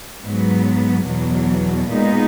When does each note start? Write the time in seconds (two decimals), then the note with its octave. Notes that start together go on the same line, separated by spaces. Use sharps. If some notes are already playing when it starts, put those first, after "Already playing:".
0.23 G#2 F#3 B3
1.06 E2 B2 F#3
1.90 A#2 G#3 B3 D#4